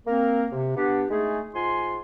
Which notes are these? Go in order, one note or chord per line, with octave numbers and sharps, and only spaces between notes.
A#3 C4 A#4
C3
B3 D4 G4
G#3 A3 D#4 G#4
G#2 F4 G#5 C6